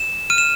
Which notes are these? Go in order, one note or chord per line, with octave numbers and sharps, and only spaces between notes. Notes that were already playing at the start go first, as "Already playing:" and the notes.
Already playing: E7
F6 D#7
E7